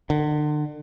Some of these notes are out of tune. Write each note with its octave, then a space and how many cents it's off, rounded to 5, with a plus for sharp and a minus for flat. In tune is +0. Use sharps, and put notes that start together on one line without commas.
D3 +35